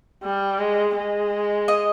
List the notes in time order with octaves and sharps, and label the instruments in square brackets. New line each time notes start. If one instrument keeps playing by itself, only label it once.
[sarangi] G3
G#3
G#3
[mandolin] D#5